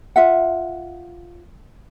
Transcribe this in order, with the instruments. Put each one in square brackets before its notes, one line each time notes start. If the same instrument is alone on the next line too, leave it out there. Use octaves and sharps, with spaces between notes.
[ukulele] F4 E5 F#5